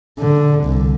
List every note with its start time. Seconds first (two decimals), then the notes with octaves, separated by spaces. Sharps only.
0.19 D3
0.65 C2